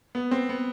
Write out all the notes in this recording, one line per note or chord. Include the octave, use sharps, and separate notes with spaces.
B3
C4
B3